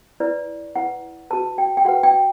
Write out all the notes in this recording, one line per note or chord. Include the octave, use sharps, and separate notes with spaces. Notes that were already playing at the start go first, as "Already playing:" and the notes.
E4 B4 D5
E4 B4 F#5
F#4 B4 A5
G5
G5
F#4 B4 F#5
G5